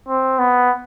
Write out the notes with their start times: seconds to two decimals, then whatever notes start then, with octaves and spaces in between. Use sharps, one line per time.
0.08 C4
0.39 B3